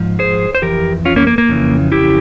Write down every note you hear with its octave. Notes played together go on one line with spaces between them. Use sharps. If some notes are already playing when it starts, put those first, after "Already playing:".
Already playing: G#2 F3
G#4 C5
C5
F2 E3 G4 A#4
C#4 F4
A#3 C#4
A#3
A#3
F2 C#3 E3
E4 G4